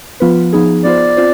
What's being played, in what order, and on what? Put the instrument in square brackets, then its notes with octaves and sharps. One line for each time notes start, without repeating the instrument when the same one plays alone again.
[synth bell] F3 B3 F4 B4
F3 B3 D#4 G#4
[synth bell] B3 F4 C5 [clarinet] D5
[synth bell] C4 F4 C5